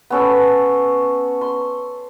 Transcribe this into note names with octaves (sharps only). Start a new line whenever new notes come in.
B3 C#4 A4
C6